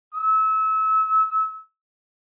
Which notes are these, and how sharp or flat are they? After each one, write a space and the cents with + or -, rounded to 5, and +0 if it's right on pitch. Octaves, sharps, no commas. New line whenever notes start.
E6 -30